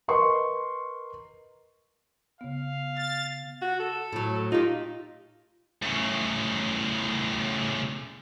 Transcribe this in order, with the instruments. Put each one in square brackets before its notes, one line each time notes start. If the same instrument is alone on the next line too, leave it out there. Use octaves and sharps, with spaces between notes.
[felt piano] A#4 B4 D#5 C6 C#6
[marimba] C#3 B3 [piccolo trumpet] F5
[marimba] F6 [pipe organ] A6
[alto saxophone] F#4
A4
[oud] A2 F#3
[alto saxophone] D#4 [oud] F4 G4
[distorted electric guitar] A2 C#3